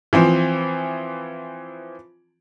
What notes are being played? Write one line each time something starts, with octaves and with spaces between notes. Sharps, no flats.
E3 F3 C4